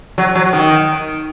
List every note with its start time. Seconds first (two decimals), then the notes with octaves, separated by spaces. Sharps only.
0.18 F#3
0.35 F#3
0.53 D#3